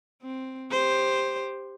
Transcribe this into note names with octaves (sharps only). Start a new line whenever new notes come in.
C4
G4 C5